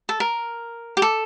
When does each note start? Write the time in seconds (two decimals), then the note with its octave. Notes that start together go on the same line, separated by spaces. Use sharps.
0.09 A4
0.20 A#4
0.97 G4
1.02 A4